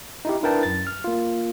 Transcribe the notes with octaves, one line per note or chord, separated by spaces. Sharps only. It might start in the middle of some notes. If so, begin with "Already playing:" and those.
D#4 E4 G4
D4 E4 A#4 B4 G5 A5
F#2 A6
F6
A#3 F4